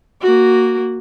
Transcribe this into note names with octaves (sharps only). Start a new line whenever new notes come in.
A#3 F#4